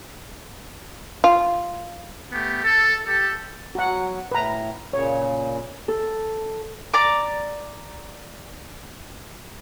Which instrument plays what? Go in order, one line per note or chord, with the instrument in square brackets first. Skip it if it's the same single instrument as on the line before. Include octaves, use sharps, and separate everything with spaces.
[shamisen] F4
[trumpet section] A3 B3 G4
A4
G4 A4
[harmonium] F#3 [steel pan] F#4 F#5
[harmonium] A2 [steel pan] B4 A#5
[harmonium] A#2 C#3 [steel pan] C#5
[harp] A4
[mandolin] D5 A#5 D6